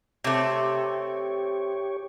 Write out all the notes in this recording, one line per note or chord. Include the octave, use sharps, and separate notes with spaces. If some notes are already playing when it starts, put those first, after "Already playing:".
C3 A3 G4 C#5